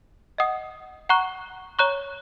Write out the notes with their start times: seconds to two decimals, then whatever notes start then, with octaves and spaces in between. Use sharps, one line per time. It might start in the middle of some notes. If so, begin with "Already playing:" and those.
0.38 D#5 F#5 D#6
1.09 F#5 A#5 C#6 F#6
1.79 C#5 A#5 C#6 F#6